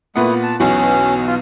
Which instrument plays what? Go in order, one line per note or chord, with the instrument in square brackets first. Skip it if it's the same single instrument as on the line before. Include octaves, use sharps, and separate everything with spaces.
[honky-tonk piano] A#2 B3 F#5 [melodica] A3 E4 D#6
[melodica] A5
[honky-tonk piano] B1 E2 B2 [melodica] C#4
[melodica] F4